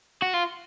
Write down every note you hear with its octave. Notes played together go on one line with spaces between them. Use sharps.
F#4
F4